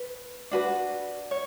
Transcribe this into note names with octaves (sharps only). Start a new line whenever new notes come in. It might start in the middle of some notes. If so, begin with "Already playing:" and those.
Already playing: B4
D4 F#4 B4
C#5